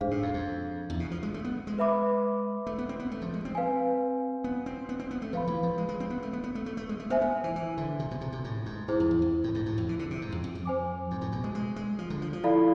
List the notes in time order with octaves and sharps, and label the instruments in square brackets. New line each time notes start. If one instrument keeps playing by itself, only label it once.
[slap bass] G#2 [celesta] D4 G#4 C5 F5
[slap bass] A2
F2
F2
E2
B2
F3
G#3
A3
B3
G#3
[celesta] B4 E5 B5 D6
[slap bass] A3
B3
C4
B3
A3
F3
G#3
C4
[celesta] B4 F5 G#5
[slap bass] B3
C4
B3
C4
B3
A3
[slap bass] F3 [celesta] B4 F5 B5
[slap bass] E3
F3
G#3
G#3
C4
B3
A3
B3
B3
A3
A3
A3
G#3
A3
[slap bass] B3 [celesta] C5 E5 G#5
[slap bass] B3
E3
E3
D3
C3
B2
C3
C3
A2
G#2
[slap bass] G#2 [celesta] E4 G#4 C5
[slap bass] F2
E2
F2
A2
G#2
A2
F2
E3
D3
C3
G#2
F2
F2
F2
[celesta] C5 G#5 D6
[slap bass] G#2
A2
B2
G#3
G#3
G#3
F3
D3
F3
F3
[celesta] E4 A4 D5 F5 B5